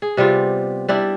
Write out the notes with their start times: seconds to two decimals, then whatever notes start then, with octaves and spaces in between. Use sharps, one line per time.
0.02 G#4
0.17 C3 G3 B3 F4
0.89 G3 D4 E4